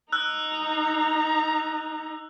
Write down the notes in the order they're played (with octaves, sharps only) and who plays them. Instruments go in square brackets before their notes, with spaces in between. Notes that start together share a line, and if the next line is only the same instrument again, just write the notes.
[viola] D#4 A#5 [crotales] E6 F#6